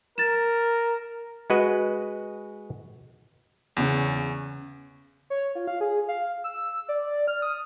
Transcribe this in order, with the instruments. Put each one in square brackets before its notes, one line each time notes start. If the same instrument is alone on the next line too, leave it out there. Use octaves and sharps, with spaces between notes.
[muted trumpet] A#4 [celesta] A6 E7
[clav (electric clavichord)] G#3 F#4 B4 D#5
[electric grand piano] E2 [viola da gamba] C#3
[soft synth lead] C#5
F4
F5
G#4
F5
E6
D5
F6
D#6